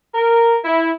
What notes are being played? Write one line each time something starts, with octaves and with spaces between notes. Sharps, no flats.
A#4
E4